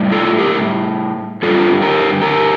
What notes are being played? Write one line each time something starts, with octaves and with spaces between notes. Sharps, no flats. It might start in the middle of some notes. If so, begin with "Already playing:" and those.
Already playing: A2 G3
F4 A4
G4 A#4
G2 D3 G3 F4 A4
G4 A#4
G4 A#4